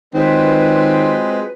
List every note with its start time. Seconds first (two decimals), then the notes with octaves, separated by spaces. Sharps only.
0.14 D#3 F#3 G#3 C4 F4 B4